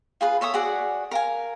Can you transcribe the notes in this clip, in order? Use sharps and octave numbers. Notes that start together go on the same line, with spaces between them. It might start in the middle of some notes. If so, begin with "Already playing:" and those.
F4 G#4 B4
A4 C#5 E5 D#6
F#4 G#4 D5 F#5
A#4 F5 G#5